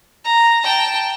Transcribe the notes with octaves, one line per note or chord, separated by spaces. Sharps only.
A#5
G5 A5